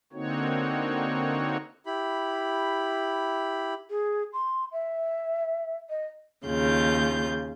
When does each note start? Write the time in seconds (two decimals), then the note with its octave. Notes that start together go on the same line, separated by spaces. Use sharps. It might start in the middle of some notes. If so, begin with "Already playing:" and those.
0.13 D3 A#3 C4 D#4 F#4 C#5
1.86 E4 G4 B5
3.90 G#4
4.33 C6
4.72 E5
5.90 D#5
6.47 D#2 C#3 F4 G6